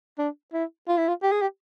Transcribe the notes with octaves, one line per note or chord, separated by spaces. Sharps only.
D4
E4
F4
E4
F4
G4
G#4
G4